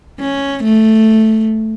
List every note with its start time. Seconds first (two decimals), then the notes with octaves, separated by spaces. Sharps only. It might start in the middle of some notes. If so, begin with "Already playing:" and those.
0.20 C#4
0.64 A3